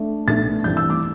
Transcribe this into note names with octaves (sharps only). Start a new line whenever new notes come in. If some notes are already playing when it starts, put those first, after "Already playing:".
Already playing: A3 D4
B1 B2 A3 D4 A6
G2 E3 A3 C4 G6
E6
D6